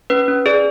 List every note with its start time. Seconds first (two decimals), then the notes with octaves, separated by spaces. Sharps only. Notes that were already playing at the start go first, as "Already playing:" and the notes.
0.10 C#4 B4
0.28 C#4
0.46 G#4 D5